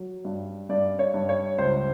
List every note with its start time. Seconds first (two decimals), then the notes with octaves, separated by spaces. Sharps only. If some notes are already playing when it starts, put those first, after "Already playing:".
Already playing: F#3
0.25 G2
0.69 G2 D5
0.99 C#5
1.14 G2
1.29 C#5
1.58 C#2 C5